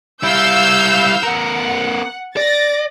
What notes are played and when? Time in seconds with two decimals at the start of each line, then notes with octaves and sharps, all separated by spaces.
0.23 G3 E4 F5 E6 G6
1.23 B3 A#4 F#5
2.37 D5 A6 A#6